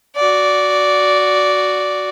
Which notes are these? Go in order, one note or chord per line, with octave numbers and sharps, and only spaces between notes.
F#4 D5